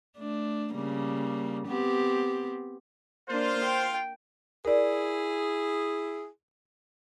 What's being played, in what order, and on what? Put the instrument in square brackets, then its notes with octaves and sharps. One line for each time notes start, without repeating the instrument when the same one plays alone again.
[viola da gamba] A3 D4
C#3 G3 A#3
B3 C4 G4
[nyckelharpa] A#3 D4 [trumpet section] F4 [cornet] C5
[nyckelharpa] G5
[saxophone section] E4 G#4 [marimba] A#4 D5